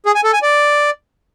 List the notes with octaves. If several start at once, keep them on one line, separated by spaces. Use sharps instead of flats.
G#4
G#5
A4
G#5
D5